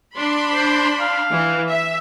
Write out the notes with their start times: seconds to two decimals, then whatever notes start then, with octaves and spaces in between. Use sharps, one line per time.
0.17 D4 B5 C6
0.53 C5
1.00 F5
1.32 E3
1.69 E5